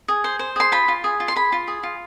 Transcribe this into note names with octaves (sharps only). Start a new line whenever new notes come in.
G#4
C5
C5
G#4 C6
F4 B5
F4
G#4
F4
C6
G#4 B5
F4
G#4
F4